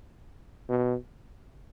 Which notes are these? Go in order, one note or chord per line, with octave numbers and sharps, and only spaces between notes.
B2